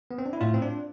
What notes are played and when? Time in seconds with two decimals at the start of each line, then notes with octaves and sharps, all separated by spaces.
0.11 B3
0.18 C4
0.26 D4
0.33 E4
0.41 A2 F4
0.54 C4
0.62 D4